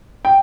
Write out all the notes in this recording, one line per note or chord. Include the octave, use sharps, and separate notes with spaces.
G5